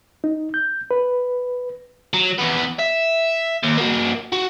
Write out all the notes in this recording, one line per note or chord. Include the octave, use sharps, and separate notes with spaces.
D#4
G6
B4
F#3
E2 B3
E5
D#2
A#3 F#4
F#4